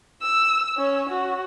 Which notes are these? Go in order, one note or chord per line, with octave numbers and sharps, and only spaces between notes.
E6
C#4 C#5
F#4